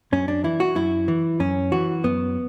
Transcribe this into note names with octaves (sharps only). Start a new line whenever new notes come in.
F#2 C#4
D4
E3 E4
F#4
F#2 E4
E3
F#2 C#4
E3 F#4
F#2 B3